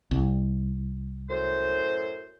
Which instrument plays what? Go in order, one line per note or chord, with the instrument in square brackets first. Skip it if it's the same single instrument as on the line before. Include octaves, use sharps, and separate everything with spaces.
[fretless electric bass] C2
[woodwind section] F#2 A2 C5